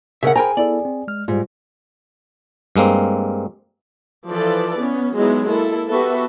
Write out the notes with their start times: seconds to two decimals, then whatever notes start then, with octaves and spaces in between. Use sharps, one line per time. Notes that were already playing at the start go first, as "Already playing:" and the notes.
0.23 C#3 A#4 E5 F#5
0.36 G#4 A#4 C5 G5 G#5 A#5 B5
0.57 B3 E4 A4 D5
0.85 C4
1.08 G#3 F6
1.28 G#2 G3 F4
2.76 G2 G#3 A#3 C4
4.26 E3 F3 A4 B4 D5
4.78 B3 C#4
5.14 F#3 G#3 B3 D#4 E4
5.47 A#3 E4 A4
5.88 B3 F#4 G4 A4 B4 E5